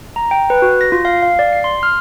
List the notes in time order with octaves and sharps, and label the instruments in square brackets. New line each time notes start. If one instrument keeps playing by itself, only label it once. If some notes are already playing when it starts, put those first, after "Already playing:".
[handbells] A#5
G5
B4
F#4
A#6
F4
F5
F5
D5
C7
C6
F6